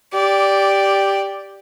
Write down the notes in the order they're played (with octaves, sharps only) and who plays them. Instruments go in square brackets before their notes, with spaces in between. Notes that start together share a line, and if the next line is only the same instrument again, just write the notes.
[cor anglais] G4 [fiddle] D5